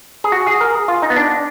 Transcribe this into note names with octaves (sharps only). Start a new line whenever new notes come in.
G#4
F#4
G#4
A#4
G#4
F4
D#4
B3
D4